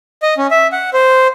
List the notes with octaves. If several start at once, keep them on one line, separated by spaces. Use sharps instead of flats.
D#5
C#4
E5
F#5
C5